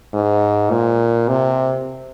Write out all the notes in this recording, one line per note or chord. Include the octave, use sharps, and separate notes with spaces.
G#2
A#2
C3